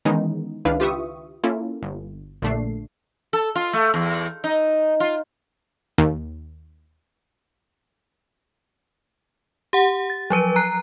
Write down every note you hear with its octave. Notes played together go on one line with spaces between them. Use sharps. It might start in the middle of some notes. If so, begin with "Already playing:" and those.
D#3 E3 G#3 B3 C#4 D#4
C#2 D#3 D4 E4 B4 F5
F4 G4 B4 E5 C#6 D#6
A#3 C#4 E4 F4 A4
G1
A#1 A#2 D3 A3 D4 C7
A4
F4
A3
E2
D#4
F4
D#2
G4 F#5
A6
F3 F#3 B4 D#7
A#5 F#6 C7